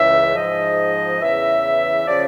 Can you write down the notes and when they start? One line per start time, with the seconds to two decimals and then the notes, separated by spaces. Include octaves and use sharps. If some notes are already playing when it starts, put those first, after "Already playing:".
Already playing: C#2 C#3 E3 E5
0.35 G#2 F3 D#5
1.21 E2 C#3 E3 E5
2.07 C#3 F3 D5